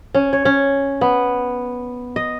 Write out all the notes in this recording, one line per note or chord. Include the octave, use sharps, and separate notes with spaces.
C#4
C#5
C#4
B3
D#5